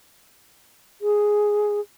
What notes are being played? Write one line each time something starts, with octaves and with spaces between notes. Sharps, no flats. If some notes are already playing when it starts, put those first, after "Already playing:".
G#4